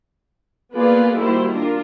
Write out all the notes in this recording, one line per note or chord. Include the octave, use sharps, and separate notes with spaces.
A#3 B3 F4 G#4 B4 D5
D#3 G3 A#3 E4 F#4 C5
D4 F4 A#4